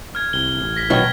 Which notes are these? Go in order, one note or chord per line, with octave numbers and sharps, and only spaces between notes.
F6 G#6
C2 G7
A1
A#6 B6
B2 D#3 F#3 F6 G#6